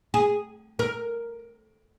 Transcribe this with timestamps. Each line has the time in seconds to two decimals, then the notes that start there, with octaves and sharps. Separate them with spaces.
0.14 G#4
0.79 A#4